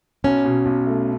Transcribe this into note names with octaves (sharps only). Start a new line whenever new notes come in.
B1 C#4
B2
B1
A3